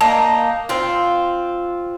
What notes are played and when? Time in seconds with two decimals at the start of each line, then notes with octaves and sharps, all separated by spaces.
0.01 A#3 D#4 A5
0.69 C4 F4